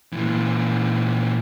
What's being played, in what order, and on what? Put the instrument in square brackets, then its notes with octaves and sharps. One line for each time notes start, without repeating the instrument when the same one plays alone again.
[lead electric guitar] A#2 E3